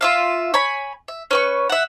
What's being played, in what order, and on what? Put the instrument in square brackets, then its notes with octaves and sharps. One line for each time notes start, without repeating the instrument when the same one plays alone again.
[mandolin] F4 E5 F5
C#5 G#5 B5
E5
C#4 B4 C#6
E5 F#5